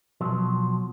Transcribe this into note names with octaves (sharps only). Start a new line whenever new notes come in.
B2 F3 F#3